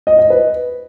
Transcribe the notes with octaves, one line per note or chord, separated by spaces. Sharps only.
D#5
D#5
B4